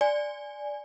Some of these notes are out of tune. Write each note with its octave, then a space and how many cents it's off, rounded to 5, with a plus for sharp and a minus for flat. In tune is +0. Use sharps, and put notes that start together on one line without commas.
D5 +0 G#5 +0